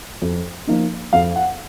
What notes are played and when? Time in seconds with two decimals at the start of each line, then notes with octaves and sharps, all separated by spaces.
0.22 F2
0.67 F3 A#3 D#4
1.13 F2 F5
1.36 F#5